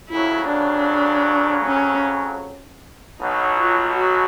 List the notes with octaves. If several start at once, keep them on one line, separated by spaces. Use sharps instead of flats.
F2 C#3 F#3 E4
D4
C#4
B1 B2 F#3 D#4
F4
F#4